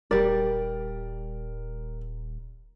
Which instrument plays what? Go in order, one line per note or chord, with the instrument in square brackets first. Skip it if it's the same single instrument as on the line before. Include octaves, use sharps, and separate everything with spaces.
[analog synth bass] D#1 [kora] G3 D5 [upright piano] A#4